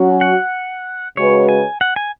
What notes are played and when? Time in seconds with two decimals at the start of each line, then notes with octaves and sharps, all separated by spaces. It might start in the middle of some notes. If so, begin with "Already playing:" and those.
Already playing: F#3 C#4 F#4
0.21 F#5
1.17 C#3 G#3 C#4 F#4 B4 C#5
1.49 G#5
1.81 F#5
1.96 G#5